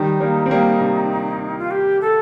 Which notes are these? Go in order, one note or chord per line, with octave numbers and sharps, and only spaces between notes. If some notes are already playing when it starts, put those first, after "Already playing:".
Already playing: D#3 G3 D#4
G3 A#3
C4
G3 A#3
C3
F4
G4
A4